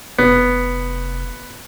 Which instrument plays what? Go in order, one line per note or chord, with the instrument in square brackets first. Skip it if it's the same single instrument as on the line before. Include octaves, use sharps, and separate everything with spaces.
[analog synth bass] F1 [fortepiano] B3